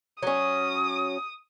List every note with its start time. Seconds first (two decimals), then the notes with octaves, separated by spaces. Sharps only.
0.22 F#3 C#4 D#6